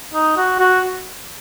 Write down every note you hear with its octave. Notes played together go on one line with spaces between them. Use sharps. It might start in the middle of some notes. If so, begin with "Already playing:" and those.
D#4
F#4
F#4